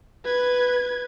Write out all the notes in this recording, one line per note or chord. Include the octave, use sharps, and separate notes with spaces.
B4 G#6